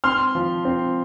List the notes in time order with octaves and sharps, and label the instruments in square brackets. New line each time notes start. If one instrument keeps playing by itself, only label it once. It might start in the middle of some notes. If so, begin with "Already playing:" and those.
[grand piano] C4 C6 F6
F3
C4